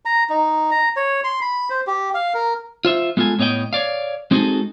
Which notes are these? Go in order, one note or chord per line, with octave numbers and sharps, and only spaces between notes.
A#5
D#4
A#5
C#5
C6
B5
C5
G4
F5
A#4
F4 C5 E5
G#3 B3 F4 A4 G#5
A2 B3 C#5 D#5 G5
C#5 D5 F5
G#3 C4 D#4 F#4 G#4 A4